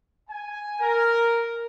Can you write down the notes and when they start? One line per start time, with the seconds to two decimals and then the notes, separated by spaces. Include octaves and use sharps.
0.30 G#5
0.80 A#4